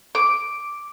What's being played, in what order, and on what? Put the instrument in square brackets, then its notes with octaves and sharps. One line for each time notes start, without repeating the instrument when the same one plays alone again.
[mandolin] D6